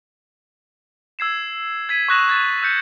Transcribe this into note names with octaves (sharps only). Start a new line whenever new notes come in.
E6 G#6 C7 E7
G#6 B6 D#7
C#6 D#6 F#6 A#6 E7 F#7
G#6 A6 E7
E6 F#6 G6 C#7